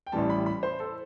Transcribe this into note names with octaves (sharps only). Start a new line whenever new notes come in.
G5
A1 A2 E3 G3 A5
B5
B5
C5
A4